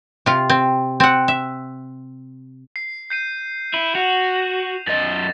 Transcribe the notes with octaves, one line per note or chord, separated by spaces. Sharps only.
C3 F4
C4
C4 F#5
E5
C7
G6 C7 D#7
E4 D#7 E7
F#4 F7
F#2 D#5 A6 A#6